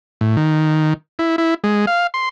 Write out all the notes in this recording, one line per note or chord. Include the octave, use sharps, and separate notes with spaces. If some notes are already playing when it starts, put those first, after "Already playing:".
A2
D#3
E4
E4
G#3
F5
C6